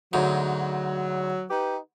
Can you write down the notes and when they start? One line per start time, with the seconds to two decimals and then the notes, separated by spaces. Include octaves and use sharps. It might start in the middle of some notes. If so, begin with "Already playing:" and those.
0.13 D2 G#2 F#3
1.51 D#4 G4 B4